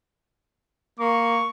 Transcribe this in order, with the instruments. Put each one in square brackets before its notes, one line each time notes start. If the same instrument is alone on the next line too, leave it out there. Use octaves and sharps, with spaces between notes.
[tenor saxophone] A#3 [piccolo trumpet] C#6